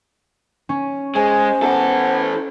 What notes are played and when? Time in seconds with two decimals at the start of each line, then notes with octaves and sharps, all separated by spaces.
0.69 C#4
1.15 G#3 C5 G#5
1.62 E3 B3 A4